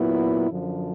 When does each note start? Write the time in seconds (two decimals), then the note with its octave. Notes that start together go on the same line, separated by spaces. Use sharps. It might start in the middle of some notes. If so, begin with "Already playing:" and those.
Already playing: A#2 F#3 B3 E4
0.49 F#2 D3 F3